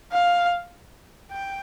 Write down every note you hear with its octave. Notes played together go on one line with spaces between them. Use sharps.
F5
G5